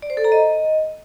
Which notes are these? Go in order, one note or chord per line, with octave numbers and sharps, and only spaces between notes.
D5
C5
A4
A#5
D#5